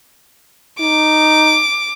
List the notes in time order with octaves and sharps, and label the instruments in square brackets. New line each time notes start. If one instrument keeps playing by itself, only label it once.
[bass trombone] D#4 [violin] D6